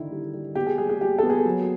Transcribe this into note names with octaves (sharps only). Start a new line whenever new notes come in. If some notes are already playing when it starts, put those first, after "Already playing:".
Already playing: D3 D#3 E4
G3
G3
B3 G4
G#4
G3 G#4
G#4
G3 G4
B3 A4
G#4
F#3